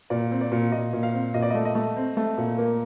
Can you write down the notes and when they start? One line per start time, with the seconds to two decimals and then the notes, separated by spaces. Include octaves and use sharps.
0.10 A#2 D5
0.31 C4
0.41 D5
0.52 A#2
0.72 A#2 D#5
0.93 A#2
1.03 F5
1.13 C4
1.34 A#2 D#5
1.42 D5
1.50 A3 D#5
1.65 D#5
1.75 A3
1.97 C4
2.17 A3
2.37 A#2
2.58 A#3